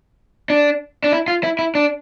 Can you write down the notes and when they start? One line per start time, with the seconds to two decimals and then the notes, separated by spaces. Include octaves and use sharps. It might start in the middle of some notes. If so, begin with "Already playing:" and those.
0.50 D4
1.04 D4
1.12 E4
1.28 F4
1.44 E4
1.59 E4
1.75 D4